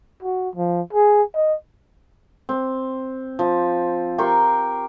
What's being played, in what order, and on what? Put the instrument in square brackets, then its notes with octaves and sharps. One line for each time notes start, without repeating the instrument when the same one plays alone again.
[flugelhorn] F#4
F3
G#4
D#5
[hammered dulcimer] C4
F3
G4 A#4 C6 C#6